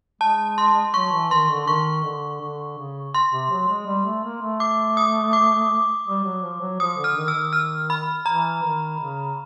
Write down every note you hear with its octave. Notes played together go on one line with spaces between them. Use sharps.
G#3 A5
C6
F#3 C#6
E3
D#3 C6
D3
D#3 C#6
D3
D3
C#3
C6
C3
F#3
G#3
G3
A3
A#3
A3
D6
D#6
D6
G3
F#3
F3
F#3
F3 D#6
D3
F6
D#3
E6
D#3
F6
B5
E3 A#5
D#3
C#3